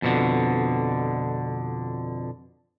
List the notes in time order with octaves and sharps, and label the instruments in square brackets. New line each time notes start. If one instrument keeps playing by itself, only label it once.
[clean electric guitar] F2 B2 D3